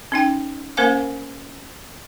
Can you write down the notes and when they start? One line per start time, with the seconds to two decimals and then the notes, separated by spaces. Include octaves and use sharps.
0.12 C#4 D#4 G5
0.77 A#3 C#4 A#4 C5 F5 G#5